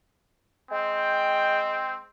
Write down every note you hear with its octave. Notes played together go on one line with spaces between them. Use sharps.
G#3 C4 G5